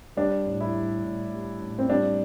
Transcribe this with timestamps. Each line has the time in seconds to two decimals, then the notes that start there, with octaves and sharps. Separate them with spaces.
0.17 G3 D4
0.46 A2
0.60 E4
0.75 G3
1.04 A2
1.33 G3
1.61 A2
1.79 C4
1.89 G3 D4